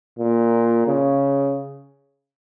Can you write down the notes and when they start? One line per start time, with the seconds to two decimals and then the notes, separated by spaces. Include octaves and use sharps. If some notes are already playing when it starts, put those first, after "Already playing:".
0.19 A#2
0.87 C#3